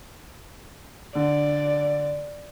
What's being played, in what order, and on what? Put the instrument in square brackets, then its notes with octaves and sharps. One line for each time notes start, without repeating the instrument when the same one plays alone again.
[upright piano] D3 [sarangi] D5